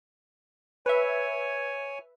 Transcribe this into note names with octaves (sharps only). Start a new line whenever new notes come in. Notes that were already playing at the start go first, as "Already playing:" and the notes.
B4 C#5 E5 G#5